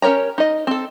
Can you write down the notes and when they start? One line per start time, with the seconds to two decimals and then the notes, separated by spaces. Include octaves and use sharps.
0.02 C#4 G4 A#4 C#5 A#5
0.38 D#4 D#5
0.67 C4 A4